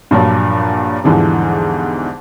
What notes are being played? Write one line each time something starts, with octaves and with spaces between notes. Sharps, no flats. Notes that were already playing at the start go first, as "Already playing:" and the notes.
G2 A#2 F3 F#3
E2 G#2 D3 E3 F3 G3